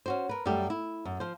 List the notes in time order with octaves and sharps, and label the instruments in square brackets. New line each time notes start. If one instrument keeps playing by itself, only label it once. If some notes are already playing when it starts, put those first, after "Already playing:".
[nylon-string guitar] C#4 F#4 C5
A#4 B4
F#2 G3 A3 G4
E4
F#2
F3 C5